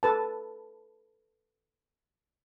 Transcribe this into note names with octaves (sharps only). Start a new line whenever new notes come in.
A4 B4 A5